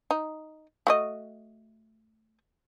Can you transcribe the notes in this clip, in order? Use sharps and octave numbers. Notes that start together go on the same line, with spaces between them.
D#4
A3 F#4 D#5